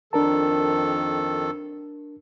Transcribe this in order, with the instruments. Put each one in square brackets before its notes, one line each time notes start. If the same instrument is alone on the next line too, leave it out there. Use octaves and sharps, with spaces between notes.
[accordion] F2 D#3 A4 [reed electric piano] D4 A#4 A5